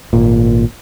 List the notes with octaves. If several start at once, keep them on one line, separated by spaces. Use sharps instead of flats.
G#1 A#2